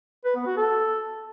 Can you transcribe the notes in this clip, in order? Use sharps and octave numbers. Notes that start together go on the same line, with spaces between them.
B4
B3
F#4
A4